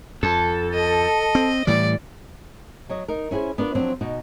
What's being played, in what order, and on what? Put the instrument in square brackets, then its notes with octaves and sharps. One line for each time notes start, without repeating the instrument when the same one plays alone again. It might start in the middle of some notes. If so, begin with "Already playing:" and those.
[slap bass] F2 [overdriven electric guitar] A4
[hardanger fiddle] D#5
[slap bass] C4
[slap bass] A2 E3 G3 [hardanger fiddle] D5
[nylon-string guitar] F#3 C#5 D#5
D#4 A#4
C#4 E4 F#4 G#4 C5
B3 D4 F4 A#4
F3 F#3 C4 D4 C5 C#5
B2 D#4 F#4